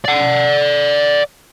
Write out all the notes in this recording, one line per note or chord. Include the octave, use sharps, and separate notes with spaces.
D5 F#5